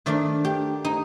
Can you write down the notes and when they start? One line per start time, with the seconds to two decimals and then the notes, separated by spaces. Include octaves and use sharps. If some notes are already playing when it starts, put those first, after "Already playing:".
0.06 D#3 A3 D4 D5
0.45 G4
0.85 D#4